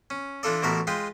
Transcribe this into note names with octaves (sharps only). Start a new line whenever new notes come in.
C#4
E3 D4 F4 A4 D5
A1 B2 E3 A#4 A5 B5
G#3 F4 B4 F5 G5